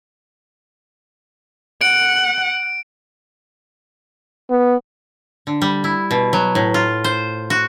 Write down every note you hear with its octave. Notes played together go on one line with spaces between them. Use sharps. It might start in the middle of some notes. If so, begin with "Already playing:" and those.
F#5 D7
B3
D3
G3
E4
B2
F#3
A2
F4
C5
F#4